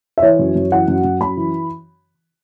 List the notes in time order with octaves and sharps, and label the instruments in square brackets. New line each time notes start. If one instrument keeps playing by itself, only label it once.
[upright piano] E5
E3 C#5
F#2
F#2
E3 F#5
F#2
F#2
F#2 B5
E3